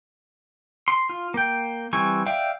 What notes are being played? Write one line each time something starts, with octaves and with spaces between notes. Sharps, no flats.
C6
F4
A#3 G5
E3 G3 C4 G#5 C#6
D5 E5 F5 G5